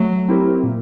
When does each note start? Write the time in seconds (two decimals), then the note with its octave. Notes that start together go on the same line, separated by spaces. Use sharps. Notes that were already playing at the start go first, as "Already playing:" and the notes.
Already playing: F#3 A3
0.28 C4 E4 G4 A#4
0.63 A#2